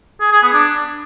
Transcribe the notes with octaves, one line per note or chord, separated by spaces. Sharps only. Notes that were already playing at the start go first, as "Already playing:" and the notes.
G#4
G#4
B3
D4